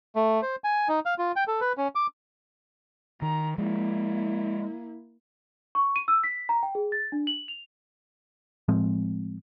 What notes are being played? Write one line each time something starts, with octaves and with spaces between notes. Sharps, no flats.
A3
C5
G#5
D#4
F5
F4
G5
A4
B4
C#4
D6
D#3 A#5
F3 G#3 A#3 E4
C#6
D#7
E6
B6
A#5
G5
G#4
A6
D4
F#7
F7
A2 F3 G#3 C4